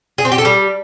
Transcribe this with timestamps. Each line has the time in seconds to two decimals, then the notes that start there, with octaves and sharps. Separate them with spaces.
0.18 G#4
0.25 C4
0.32 G4
0.38 A4
0.45 G3